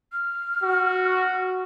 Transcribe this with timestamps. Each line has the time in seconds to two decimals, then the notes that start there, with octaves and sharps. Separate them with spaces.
0.12 F6
0.63 F#4